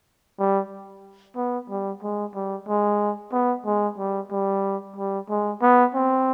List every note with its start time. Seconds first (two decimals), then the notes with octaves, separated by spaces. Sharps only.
0.39 G3
1.36 B3
1.70 G3
2.02 G#3
2.35 G3
2.68 G#3
3.32 B3
3.65 G#3
3.98 G3
4.31 G3
4.96 G3
5.29 G#3
5.62 B3
5.95 C4